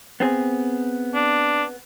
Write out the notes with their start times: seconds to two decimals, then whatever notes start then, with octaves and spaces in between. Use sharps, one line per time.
0.20 B3 C4 G#4
1.14 D4